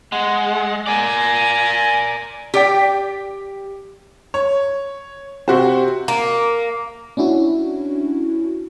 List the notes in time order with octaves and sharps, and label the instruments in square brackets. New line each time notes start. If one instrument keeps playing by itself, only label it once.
[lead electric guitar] G#3 [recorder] F#5
[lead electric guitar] A#4 D5 [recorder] G#5
[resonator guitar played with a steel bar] G4 D5 G5
[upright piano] C#5
[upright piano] C3 F#4 C5 [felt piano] G4
[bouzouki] A#3
[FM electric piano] C#4 D4 E4 F#4